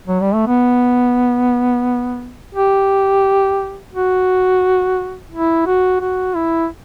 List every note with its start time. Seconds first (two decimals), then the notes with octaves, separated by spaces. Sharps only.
0.08 F#3
0.21 G3
0.34 A3
0.47 B3
2.55 G4
3.94 F#4
5.32 E4
5.67 F#4
6.01 F#4
6.35 E4